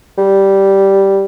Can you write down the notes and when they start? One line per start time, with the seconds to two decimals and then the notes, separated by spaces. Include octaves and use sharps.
0.18 G3